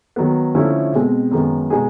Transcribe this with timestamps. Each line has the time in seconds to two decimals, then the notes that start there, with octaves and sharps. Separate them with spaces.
0.16 D#3 F#3 B3
0.55 D3 F3 A3 C#4 E4
0.93 B2 G#3 C4
1.31 F#2 D#3 G#3 B3
1.70 B2 G#3 B3 D#4 G#4